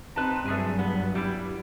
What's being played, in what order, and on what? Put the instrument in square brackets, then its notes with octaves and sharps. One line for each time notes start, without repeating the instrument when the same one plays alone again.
[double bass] C4 D#4 [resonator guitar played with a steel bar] B4 A5
[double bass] G2 F#3 [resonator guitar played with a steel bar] A3 G#4 G#5
[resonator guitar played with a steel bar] B3
G3 E4